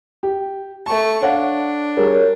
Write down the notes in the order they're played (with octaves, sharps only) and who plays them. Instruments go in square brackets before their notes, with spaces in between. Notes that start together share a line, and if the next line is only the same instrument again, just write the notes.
[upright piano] G4
[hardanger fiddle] A3 C#6 [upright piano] A5
[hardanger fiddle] D4 [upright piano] C#5 F5 F#5
[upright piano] G3 [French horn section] G#4 A#4 C#5